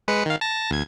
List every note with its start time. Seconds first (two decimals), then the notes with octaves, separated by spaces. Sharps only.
0.08 G#3 B4 C#7
0.26 D#3 F5
0.41 A5 A#6
0.71 D2 G#6